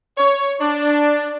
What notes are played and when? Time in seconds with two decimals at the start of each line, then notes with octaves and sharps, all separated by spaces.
0.18 C#5
0.61 D4